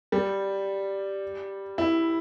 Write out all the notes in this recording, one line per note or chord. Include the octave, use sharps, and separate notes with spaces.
G3
E4